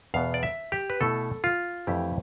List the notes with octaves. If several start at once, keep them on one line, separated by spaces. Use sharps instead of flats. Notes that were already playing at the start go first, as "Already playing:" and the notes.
E2 B2 B3 F5
D5
E5
G4
B4
B2 A3 E4 A4
F4
F2 E3 A3 E4 G4